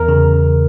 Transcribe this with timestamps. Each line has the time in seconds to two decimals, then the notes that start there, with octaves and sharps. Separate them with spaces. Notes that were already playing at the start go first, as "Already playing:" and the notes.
Already playing: E2 A#4
0.08 C#3